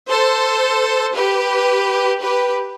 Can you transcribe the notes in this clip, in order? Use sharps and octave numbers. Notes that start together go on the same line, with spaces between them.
A4 C5
G4 B4
G4 B4